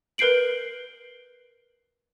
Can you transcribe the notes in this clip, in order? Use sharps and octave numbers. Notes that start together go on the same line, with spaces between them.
A#4 B4 G6 C7 D7 F#7